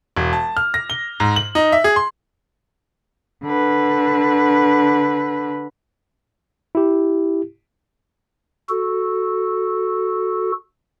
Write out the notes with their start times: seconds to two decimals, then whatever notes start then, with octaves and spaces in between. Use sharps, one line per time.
0.17 E1
0.33 A5
0.57 F6
0.74 A#6
0.90 G7
1.20 G#2
1.36 F#7
1.55 D#4
1.72 E5
1.84 G#4
1.96 C6
3.44 D3 B4
6.75 E4 G4
8.69 F#4 A4